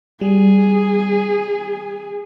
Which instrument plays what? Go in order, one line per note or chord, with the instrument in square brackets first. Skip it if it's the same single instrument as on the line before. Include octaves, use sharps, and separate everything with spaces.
[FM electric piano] G3 [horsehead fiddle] G#4